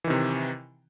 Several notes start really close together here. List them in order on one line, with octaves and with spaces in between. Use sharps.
E3 D#3 C3